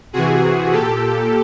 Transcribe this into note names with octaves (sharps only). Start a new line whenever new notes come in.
C3 E3 F#4 G#4
A#2 G4 A4